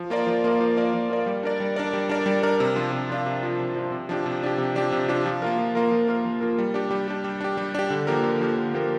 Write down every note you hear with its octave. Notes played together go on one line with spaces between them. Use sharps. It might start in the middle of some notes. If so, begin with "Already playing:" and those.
Already playing: F3
A#3 F4 A#4 D5
F3
A#3 F4 A#4 D5
F3
A#3 F4 A#4 D5
F3
A#3 F4 A#4 D5
G3
D4 A#4 D5
G3
D4 A#4 D5
G3
D4 A#4 D5
G3
D4 A#4 D5
C3
F3 D4 F4
C3
F3 D4 F4
C3
F3 D4 F4
C3
F3 D4 F4
C3
F3 D4 G4
C3
F3 D4 G4
C3
F3 D4 G4
C3
F3 D4 G4
F3
A#3 F4 A#4
F3
A#3 F4 A#4
F3
A#3 F4 A#4
F3
A#3 F4 A#4
G3
D4 G4
G3
D4 G4
G3
D4 G4
G3
D4 G4
D3
F3 A#3 G4 A#4
D3
F3 A#3 G4 A#4
D3
F3 A#3 G4 A#4